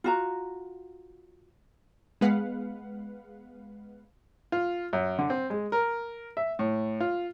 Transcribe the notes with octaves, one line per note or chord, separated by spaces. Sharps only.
F4 F#4 A#5
G#3 B3 B4 F5 F#5
F4
F#2
D3
C4
G#3
A#4
E5
A2
F4